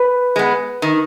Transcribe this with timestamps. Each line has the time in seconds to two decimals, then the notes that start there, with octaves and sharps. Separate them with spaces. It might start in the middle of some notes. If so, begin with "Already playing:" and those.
Already playing: B4
0.36 G#3 B3
0.82 D#3